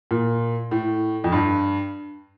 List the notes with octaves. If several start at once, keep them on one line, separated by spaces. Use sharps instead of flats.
A#2
A2
F2
G2